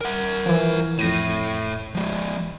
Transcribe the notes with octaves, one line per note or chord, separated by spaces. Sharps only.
A#4 F#5
E3 F3
F2 A2 A#6 D#7
F3 G#3